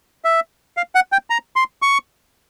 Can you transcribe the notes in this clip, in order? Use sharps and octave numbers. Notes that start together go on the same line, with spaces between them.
E5
F5
F#5
G5
A#5
C6
C#6